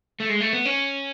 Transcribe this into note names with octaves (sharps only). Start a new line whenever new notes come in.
A3
G#3
A3
B3
C#4